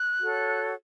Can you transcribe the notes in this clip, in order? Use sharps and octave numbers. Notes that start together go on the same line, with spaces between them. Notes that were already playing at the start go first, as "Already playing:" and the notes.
Already playing: F#6
F#4 A4 C#5